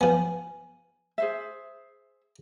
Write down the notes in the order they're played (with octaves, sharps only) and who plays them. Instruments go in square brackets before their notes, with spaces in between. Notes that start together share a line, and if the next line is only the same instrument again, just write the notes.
[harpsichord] F3 B3 [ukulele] G#5
[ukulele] G#4 C5 E5